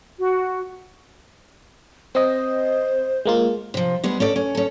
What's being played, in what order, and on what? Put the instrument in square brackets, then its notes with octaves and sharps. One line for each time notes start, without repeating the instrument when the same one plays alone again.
[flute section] F#4
[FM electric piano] C4 D#5 [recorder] C5
[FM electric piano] G#3 A#3 F4
[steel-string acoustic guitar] C3 F3
G3 G#3 B3
C#4 A4 D5
C#4
C#4 A4